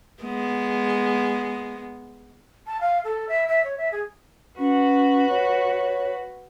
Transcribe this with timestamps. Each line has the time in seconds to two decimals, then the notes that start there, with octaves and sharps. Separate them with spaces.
0.23 G#3 B3
2.67 A5
2.81 F5
3.05 A4
3.29 E5
3.48 E5
3.64 C#5
3.78 E5
3.92 G#4
4.59 C#4 F#4 B4
5.29 C#5